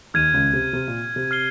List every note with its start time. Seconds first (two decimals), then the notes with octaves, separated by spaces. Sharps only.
0.14 D#2 D#3 F6 G#6 D#7
0.34 C#2 C#3
0.53 C3
0.73 C3
0.88 A#2
1.16 C3
1.31 F6 C7 G7